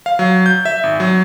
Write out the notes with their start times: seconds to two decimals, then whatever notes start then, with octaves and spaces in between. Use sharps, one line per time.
0.06 F5
0.19 F#3
0.46 G6
0.65 E5
0.83 G#1
1.00 F#3